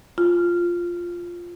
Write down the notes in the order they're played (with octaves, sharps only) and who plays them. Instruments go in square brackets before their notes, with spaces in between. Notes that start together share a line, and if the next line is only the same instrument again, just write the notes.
[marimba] F4